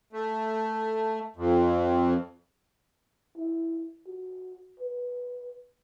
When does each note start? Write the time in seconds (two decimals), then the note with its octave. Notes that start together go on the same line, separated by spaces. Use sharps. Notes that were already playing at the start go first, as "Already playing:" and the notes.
0.13 A3
1.36 F2
3.37 E4
4.07 F#4
4.80 B4